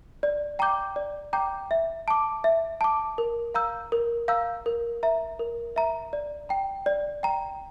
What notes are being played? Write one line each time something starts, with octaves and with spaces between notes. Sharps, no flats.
D5
G5 A#5 D6 G6
D5
G5 A#5 D6 G6
E5
A5 D6
E5
A5 D6
A#4
F5 A#5 E6 G6
A#4
F5 A#5 E6 G6
A#4
E5 A#5
A#4
E5 A#5
D5
G5 A#5
D5
G5 A#5